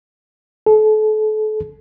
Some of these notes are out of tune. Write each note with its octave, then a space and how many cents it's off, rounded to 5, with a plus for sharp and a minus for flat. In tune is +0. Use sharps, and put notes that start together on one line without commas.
A4 -35